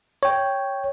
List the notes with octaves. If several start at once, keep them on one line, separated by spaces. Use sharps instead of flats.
C#5 G5